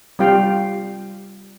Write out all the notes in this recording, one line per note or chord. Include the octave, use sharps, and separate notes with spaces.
G3 C4 F4 F5 G5